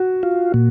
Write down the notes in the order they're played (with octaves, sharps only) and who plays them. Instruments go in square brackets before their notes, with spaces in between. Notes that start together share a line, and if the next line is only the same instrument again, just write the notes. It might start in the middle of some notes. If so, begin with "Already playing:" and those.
Already playing: [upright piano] F#4
[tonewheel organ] F4
A#2